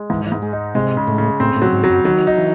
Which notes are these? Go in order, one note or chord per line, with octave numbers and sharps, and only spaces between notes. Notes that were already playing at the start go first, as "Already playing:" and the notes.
Already playing: G#3
G#2 E3
E3
G#2
G#3
D#4
C3 G#3
C#3
A2
C#3
A2 C4
A2
F#3
G#2
F#3
F#2
D#3 F#3
D#4
E3